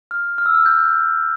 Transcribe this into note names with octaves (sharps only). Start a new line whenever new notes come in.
F6
F6
E6
F6
G6